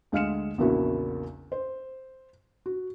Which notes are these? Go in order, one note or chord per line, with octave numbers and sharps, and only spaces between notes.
D2 G#3 F5 F6 C#7 E7
A#1 E2 C#3 A#3 E4 F#4
C5
F#4